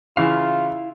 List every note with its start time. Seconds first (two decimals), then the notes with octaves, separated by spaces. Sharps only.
0.17 C#3 E3 E4 F4 F5